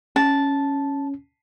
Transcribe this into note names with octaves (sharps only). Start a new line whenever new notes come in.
C#4 A5